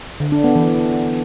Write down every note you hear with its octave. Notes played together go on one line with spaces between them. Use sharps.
D3
D4
B3
E3